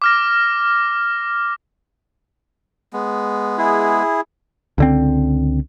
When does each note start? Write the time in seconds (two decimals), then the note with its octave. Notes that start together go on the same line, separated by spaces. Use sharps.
0.02 D6 F6 A#6
2.93 G#3 B3
3.58 E4 G#4
4.78 C#2 D3 C4